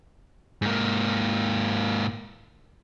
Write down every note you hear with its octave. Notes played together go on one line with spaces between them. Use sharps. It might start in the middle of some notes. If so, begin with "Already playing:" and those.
G#2 A#3